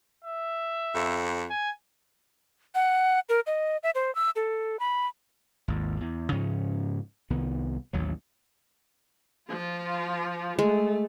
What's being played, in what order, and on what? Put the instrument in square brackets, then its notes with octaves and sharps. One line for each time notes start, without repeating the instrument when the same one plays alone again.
[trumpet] E5
[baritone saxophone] F2
[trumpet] G#5
[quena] F#5
A#4
D#5
E5
C5
E6
A4
B5
[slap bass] G#1 D#2
E2
G#2 C#3 F3 C#4
C2 D#3 B3
A1 D#2 F#3
[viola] F3 F4
[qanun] G#3 [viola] A3